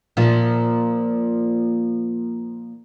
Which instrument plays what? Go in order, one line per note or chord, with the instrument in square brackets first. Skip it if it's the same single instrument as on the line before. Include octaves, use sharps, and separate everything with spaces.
[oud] A#2 F3 F4